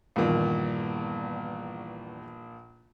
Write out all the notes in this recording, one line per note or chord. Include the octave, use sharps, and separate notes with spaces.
A#1 E2 G2 A#2 D#3